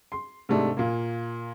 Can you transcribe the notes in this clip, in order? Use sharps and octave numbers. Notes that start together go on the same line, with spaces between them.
C6
G#2 C3 A3 D4
A#2 A#3